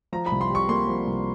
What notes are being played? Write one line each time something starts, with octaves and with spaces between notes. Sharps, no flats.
F3 A#5
B5
C2
C6
C3 C#6
A#3 C6
F3
C2